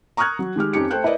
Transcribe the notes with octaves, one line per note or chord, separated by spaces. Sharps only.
A#5 C#6 D#6 F6 F#6 G#6
F#3
D#3 G#3 G4 F6
F2 C#4 D#4 G4 C#7
A3 C5 G5 F#6 G6
E4 A#4 B4 D5 D#5